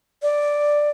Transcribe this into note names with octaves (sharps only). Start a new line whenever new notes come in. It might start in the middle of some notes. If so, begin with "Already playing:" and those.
D5